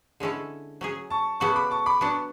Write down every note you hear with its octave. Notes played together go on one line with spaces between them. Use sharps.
D3 G#3 C#4 E4 A4
F#3 C#4 G#4
A5 C#6
C#3 F#3 B3 F#4 A4 A5 C#6
B5 D6
A5 C#6
B5 D6
F#3 B3 D4 A5 C#6